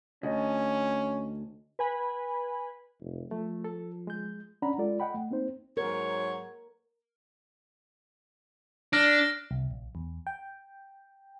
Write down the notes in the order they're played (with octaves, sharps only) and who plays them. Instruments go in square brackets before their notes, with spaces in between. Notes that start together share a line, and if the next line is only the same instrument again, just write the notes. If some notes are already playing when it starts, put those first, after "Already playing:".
[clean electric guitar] D2 [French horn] C#4 [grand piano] D#5
[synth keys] B4 G#5 B5
[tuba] F1
[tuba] F3 [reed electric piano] A3
[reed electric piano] A4
G#3 G6
C#4 D4 D5 F#5 A#5 B5
G#3 F4 A4 D5
D#5 F#5 G5 B5
A3
A#3 C4 D#4 C5
[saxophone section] G#2 F#3 C#5 [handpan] A#4
[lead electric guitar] D4 [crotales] F6 A#6 D7
[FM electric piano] C2
A#1
E2
G5